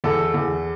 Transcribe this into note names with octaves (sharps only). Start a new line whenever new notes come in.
E2 A4
E2